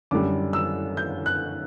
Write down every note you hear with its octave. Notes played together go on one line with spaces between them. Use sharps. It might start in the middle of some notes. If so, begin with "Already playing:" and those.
F#2 D3 G3 D6
E6
G6
F#6